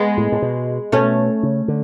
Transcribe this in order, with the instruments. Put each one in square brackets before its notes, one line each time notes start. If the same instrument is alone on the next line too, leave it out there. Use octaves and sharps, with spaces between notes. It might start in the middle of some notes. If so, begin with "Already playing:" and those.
Already playing: [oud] G#3 B3
[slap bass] A2
A2
B2
[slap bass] B2 [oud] A3 C#4
[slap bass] C#3
D3